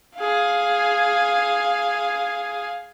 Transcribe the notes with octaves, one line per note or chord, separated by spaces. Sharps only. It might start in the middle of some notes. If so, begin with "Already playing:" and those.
G#4 F5